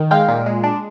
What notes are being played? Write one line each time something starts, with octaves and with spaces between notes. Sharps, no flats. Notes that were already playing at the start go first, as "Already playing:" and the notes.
Already playing: D#3
G#3 F5 G5
A#2
G#3
D4